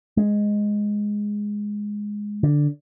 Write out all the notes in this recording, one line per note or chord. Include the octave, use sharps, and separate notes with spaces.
G#3
D3